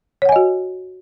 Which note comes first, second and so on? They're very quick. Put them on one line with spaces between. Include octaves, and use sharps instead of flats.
C#5 F#5 G#5 D#5 F#4